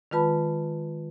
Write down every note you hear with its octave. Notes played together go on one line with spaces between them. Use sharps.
D#3 G#3 F4 B4 A5 B5